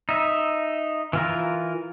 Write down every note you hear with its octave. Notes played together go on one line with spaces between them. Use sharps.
D#4 E5
E3 F4 A#4